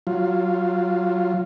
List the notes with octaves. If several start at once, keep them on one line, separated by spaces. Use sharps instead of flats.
F#3 F4